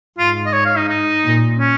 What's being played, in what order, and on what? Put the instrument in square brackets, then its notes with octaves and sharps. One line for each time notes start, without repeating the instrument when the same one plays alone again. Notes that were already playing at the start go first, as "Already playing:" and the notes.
[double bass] G#2 [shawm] F4
[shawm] D#5
C#5
F5
D#4
D#4
[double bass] A#2
[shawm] C#4